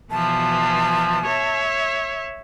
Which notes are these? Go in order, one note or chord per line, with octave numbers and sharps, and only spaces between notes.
B2 E3 F3 A5
C#5 E5